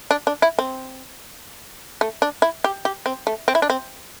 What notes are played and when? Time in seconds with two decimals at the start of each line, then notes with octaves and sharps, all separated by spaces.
0.11 D4
0.27 D4
0.42 E4
0.59 C4
2.01 A3
2.22 D4
2.42 E4
2.64 G4
2.85 G4
3.06 C4
3.27 A3
3.48 C4
3.55 E4
3.62 D4
3.70 C4